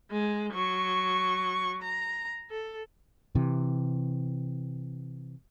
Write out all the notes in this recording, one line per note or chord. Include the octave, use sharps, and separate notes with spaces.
G#3
F#3 C#6
A#5
A4
C3 E3